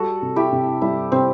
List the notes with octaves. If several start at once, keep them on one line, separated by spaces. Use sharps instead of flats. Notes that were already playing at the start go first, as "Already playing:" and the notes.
Already playing: G3 F#4 A4
C3
E4 G4
C3
G3 E4
C3 C4